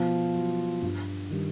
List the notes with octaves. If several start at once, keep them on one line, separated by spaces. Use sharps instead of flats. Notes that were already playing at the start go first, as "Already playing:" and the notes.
Already playing: B2 F3 F4
F#3
G2
D#3 G3